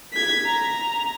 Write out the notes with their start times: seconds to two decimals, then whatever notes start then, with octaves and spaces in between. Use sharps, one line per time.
0.13 G#6 B6
0.47 A#5